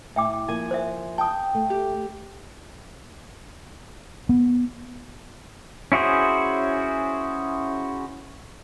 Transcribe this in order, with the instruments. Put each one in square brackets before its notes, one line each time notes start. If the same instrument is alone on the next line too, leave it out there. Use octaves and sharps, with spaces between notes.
[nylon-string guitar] A2 [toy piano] E5 G5 D6
[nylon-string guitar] F3 A#3 [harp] G#5
[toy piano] C5 E5
[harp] G5 [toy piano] A5 D#6
[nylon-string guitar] A3
[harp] G4
[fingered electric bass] B3
[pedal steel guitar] C#4 E4 F#4 G#4 C5